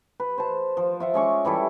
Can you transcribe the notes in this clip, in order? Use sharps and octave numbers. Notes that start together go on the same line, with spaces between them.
B4
C5 A5
F3
F4 E5 F#5
G#3 C#4 C#6 D6
E3 G3 E4 A4